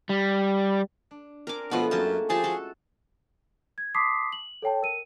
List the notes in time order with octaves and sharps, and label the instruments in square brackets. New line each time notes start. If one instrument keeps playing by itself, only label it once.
[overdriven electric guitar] G3
[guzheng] D4
[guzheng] C4 D4 G#5 [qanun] A#4 D6
[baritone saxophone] B2 [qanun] F3 B3 [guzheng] G#3 A3 B4
[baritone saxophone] F#2 [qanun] A#3 F#4 A5 [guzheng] C#4
[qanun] F3 G4 A5 [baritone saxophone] G#4
[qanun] F#4 A4
[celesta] G#6
A5 C6 D6 D#6 B6 C7
F#7
A4 C#5 G5 A5
A#4 D#7